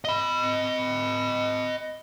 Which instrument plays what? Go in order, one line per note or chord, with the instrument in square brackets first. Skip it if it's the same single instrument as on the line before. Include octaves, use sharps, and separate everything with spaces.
[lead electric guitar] D#5 B5